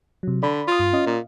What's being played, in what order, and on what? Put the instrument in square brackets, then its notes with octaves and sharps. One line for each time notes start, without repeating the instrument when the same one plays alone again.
[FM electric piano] C3 F#3
[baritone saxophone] D3 [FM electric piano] D5 B5
[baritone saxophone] F4 [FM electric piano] C6 D#6
[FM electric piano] G2
C#4 D#5 F5
[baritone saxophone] A#2